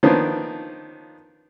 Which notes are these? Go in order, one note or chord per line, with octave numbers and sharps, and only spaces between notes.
D#3 F3 A#3 B3 C#4 D4